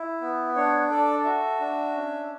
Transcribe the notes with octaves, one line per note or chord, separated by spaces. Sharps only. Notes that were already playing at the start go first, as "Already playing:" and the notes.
Already playing: E4
B3
D4 C#5
A4 D5
F#4 E5
D4
C#4